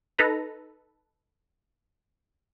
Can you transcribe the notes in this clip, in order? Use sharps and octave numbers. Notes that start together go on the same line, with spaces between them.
D#4 A4 B4 A#5